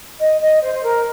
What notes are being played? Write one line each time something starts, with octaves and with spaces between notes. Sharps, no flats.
D#5
D#5
C5
C5
A#4